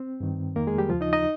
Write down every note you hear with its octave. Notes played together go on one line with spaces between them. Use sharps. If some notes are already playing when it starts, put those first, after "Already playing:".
Already playing: C4
G2 D#3
F2 D#3 A#3 A#4
G#3 G#4
G3 G4
D#2 C#3 F3 F4
D#4 D#5
D#4 D#5